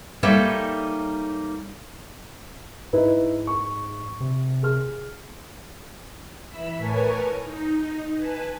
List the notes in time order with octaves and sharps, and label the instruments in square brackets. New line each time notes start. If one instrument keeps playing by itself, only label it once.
[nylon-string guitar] G3 A#3 D#4 A4 C#5 E5
[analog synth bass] G#2 [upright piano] D#4 E4 B4
[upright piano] C#6
[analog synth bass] C3
[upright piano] G#4 F6
[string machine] E3 E5 B5 E6 B6
A2 A#4 B4 C#5 G#5 A5
D#4
B4 G#5 A5